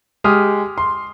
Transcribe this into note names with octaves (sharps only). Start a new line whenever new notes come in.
G#3 G4 D#6 F6
C6